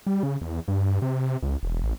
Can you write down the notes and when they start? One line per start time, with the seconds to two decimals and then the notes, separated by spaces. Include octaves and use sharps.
0.06 G3
0.23 C#3
0.42 E2
0.68 G2
1.02 C3
1.43 C#2
1.63 E1
1.83 A1